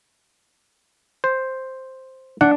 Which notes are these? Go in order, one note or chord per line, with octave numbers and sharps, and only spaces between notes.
C5
D4 F#5